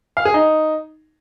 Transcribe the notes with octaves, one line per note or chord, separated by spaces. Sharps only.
F5
G#4
D#4